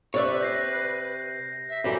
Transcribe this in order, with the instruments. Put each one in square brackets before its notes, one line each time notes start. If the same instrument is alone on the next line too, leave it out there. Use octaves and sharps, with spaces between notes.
[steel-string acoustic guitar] C3 [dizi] B4 [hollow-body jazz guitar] C#5 D5 E5
[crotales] G6 A#6 C7
[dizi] E5
[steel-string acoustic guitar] F#2 D3 E3 [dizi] G4